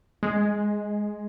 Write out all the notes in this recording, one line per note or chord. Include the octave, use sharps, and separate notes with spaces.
G#3